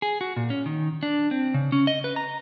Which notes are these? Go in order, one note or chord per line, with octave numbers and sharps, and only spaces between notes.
G#4
F#4
A#2
C#4
D#3
D4
C4
C#3
C#4
D#5
B4
A#5